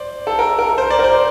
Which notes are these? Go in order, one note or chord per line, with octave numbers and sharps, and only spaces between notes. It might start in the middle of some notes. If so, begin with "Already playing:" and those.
Already playing: C5 D5
A4
A#4
A#4
C5
D5
A#4
C5